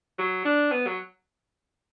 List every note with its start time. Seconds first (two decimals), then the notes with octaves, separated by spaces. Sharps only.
0.18 F#3
0.45 D4
0.72 B3
0.86 F#3